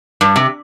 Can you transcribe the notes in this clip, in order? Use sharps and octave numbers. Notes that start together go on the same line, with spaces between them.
G2
C3